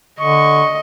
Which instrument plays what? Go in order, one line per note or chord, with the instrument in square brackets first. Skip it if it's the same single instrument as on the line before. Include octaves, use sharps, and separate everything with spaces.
[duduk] D3 [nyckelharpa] D#5 [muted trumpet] C#6